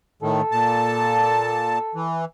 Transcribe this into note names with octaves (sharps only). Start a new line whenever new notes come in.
A2 D#3 A4
A#2 A5
E3